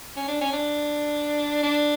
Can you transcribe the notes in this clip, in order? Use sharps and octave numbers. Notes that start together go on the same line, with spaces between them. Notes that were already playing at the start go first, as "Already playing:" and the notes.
C#4
D4
C#4
D4
D4